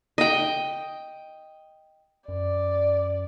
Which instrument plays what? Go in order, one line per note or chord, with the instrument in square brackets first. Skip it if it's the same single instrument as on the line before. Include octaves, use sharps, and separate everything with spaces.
[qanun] D#5 G5
[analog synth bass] F#2 [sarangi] D5